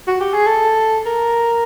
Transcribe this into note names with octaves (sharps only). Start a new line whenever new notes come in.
F#4
G4
G#4
A4
A#4